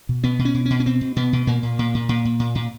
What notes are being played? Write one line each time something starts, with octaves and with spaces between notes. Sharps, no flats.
B2
B2 B3
B2
C#4
B2
B2 C#4
C#4
B2 C4
B2
B2 B3
B2
A#2 A#3
A#2
A#2
A#2
A#2
A#2
A#2
A#2